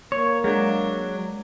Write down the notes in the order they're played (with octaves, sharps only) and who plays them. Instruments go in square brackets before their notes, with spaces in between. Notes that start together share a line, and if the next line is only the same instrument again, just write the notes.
[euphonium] A#3 [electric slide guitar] C#5
[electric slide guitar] F#3 [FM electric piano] G#3 [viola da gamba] D4